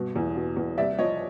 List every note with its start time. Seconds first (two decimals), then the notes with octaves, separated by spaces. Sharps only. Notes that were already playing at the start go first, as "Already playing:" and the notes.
Already playing: G2 B2
0.16 E2
0.36 B2
0.57 E2
0.77 C2 D5 E5
0.98 F3 C#5 D#5